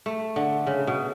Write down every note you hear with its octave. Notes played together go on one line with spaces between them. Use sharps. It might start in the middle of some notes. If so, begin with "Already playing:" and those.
A3
D3
C#3
B2